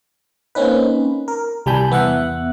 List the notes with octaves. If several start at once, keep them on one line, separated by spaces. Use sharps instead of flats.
A#3 C4 C#4 D#4 B4
A#4
C2 G3 G#5 A5 B5 G6
E2 B3 E5 F#5 F#6